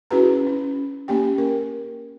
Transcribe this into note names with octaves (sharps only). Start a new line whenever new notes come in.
C#4 E4 F#4 G#4 B4 A#5
C#4
A#3 C#4 G4 G5
A#4